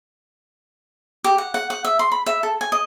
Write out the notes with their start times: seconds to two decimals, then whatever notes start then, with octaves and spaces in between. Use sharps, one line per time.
1.24 G4
1.38 F#5
1.54 F#5
1.70 F#5
1.85 E5
1.99 C6
2.12 B5
2.26 E5
2.43 A4
2.61 G#5
2.72 D#5